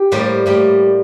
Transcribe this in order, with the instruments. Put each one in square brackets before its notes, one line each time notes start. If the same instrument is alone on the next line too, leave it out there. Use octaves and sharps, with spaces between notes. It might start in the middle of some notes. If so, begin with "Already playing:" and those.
Already playing: [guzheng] G4
A2 G3 A#3 C5
A2 G3 A#3